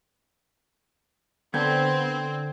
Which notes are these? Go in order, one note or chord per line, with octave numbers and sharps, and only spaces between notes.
D3 B3 C4 G5 G6 G#6